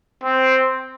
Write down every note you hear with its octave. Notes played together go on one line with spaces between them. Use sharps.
C4